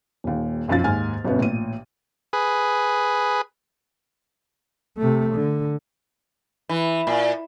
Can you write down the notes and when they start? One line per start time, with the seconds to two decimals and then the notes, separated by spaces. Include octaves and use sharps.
0.24 D#1 D#2
0.68 B1 F#2 F3 A6
0.84 D#2 G#2 G#5 F6
1.24 G1 B2 B3 C#4
1.39 A1 A#2 D#7
2.33 G#4 B4
4.98 C3 A3
5.34 D3
6.69 E3
7.07 A#2